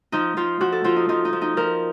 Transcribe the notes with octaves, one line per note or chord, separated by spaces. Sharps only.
F3 D#4
F3 F4
F3 F#4
A4
F3 F4
D#4
F3 D#4
D#4
F3
D#4
F3 A#4